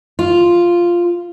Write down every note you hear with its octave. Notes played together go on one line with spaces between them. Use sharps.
F4